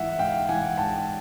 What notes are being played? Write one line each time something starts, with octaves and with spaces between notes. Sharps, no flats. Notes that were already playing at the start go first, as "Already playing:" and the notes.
Already playing: G#2 E3 E5 F#5
G#2 F5 G5
E3 F#5 G#5
G#2 G5 A5